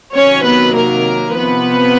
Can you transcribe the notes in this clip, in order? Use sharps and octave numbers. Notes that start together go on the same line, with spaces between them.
C3 D#3 F#3 C#4 C#5
B3 B4
A#3 A#4
C3 F3 B3 B4